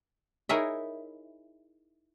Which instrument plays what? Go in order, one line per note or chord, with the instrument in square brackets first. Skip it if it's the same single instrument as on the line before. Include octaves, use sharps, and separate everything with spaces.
[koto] D#4 E4 G#4 A#4 C#5 E5